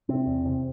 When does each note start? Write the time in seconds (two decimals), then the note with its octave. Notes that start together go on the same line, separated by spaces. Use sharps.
0.09 C3 C4
0.27 E2
0.45 C3